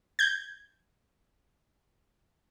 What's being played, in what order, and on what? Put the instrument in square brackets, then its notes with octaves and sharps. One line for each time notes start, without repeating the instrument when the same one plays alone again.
[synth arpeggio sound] G6 G#6